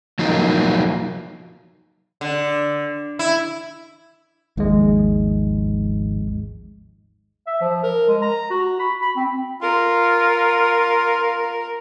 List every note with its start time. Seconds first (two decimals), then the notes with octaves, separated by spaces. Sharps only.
0.19 F3 F#3 A#3 D#4 F4
2.21 D3
3.19 E4
4.57 G#1 D#2 G#2 F3 G#3
7.47 E5
7.61 F3
7.83 A#4
8.09 G#3
8.22 A#5
8.50 F#4
8.80 B5
9.02 B5
9.16 C4
9.62 F4 A#4